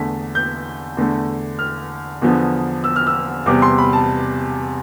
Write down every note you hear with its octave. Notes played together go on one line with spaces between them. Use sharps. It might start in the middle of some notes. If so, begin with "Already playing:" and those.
Already playing: E2 D3 A3 B6
G6
E2 D3 A3
F6
E2 D3 F3 B3
E6
F6
E6
E2 C3 G3 B3 D6
C6
B5
A5